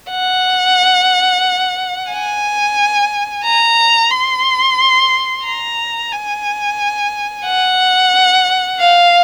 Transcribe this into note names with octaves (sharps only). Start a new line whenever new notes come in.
F#5
G#5
A#5
C6
A#5
G#5
F#5
F5